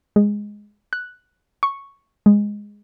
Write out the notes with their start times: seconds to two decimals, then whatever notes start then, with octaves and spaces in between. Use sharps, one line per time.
0.16 G#3
0.93 F#6
1.63 C#6
2.26 G#3